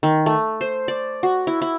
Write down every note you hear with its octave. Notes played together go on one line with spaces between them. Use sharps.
D#3
A3
C5
D5
F#4
E4
E4